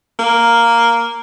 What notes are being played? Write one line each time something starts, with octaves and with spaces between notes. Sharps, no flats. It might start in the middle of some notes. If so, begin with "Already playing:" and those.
A#3